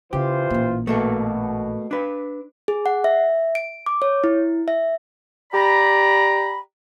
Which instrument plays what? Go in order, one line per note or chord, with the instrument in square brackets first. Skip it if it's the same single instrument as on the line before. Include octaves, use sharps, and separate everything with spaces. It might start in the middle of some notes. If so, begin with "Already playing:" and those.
[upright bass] C#3 [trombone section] E3 F4 C5 [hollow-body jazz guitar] G4
[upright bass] A1 A#2
[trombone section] B2 [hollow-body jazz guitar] A3 A#3 A4
[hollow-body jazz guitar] D4 B4
[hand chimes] G#4
F#5
E5
D7
D6
C#5
E4
E5
[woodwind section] G4 D5 A#5 B5